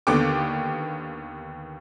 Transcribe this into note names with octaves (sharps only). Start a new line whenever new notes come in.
D#2 D3 B3 G5 D6